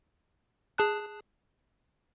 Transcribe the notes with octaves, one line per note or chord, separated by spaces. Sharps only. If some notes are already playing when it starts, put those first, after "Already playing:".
G#4 A5 F#6